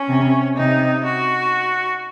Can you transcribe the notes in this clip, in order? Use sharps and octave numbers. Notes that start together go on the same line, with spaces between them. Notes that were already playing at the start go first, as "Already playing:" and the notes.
Already playing: C#4
C3
C3 D#4
F#4